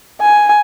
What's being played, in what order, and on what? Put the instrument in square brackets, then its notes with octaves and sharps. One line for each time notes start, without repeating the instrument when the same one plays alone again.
[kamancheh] G#5